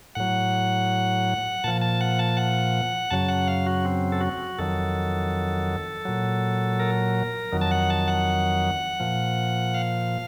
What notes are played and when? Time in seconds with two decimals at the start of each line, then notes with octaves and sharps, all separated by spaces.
0.15 A2 F#3 F#5
1.64 A#2 F3 A5
1.81 A5
2.01 F#5
2.19 A5
2.37 F#5
3.11 F#2 C#3 F#3 A5
3.29 F#5
3.48 F5
3.66 F#4
3.85 C4
4.12 A4
4.21 F#4
4.59 F2 D#3 F#3 A4
6.05 A#2 F#3
6.80 A#4
7.52 F2 D#3 F#3
7.61 A5
7.71 F#5
7.90 A5
8.08 F#5
9.00 A#2 F3
9.74 F5